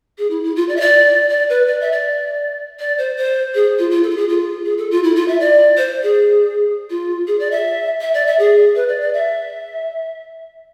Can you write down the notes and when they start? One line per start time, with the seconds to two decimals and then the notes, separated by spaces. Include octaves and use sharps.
0.18 G#4
0.30 E4
0.44 E4
0.56 F4
0.69 D5
0.77 E5
0.81 D5
1.30 D5
1.49 B4
1.67 D5
1.81 E5
1.92 D5
2.79 D5
2.98 C5
3.17 C5
3.55 G#4
3.79 F4
3.91 F4
4.03 A4
4.10 F4
4.17 G#4
4.29 F4
4.65 G#4
4.78 A4
4.91 F4
5.04 E4
5.16 F4
5.28 E5
5.40 D5
5.77 C5
6.03 G#4
6.90 F4
7.28 G#4
7.39 D5
7.51 E5
8.01 E5
8.14 D5
8.27 E5
8.39 G#4
8.75 B4
8.88 D5
9.01 D5
9.14 E5